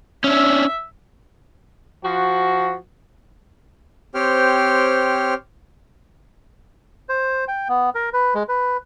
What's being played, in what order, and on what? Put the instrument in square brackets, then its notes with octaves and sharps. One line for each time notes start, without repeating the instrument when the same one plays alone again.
[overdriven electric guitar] C#4 D4 [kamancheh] E5
[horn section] F3 F#4
[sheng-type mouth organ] C4 G4 C5 C#5 G5 F6
[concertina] C5
G5
B3
A#4
B4
G#3
B4